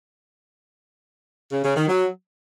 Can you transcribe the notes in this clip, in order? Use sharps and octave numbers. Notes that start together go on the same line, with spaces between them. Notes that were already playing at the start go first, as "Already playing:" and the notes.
C#3
C#3
D#3
F#3